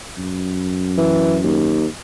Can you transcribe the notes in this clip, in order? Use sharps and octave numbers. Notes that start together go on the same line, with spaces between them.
F#2
E3
D#2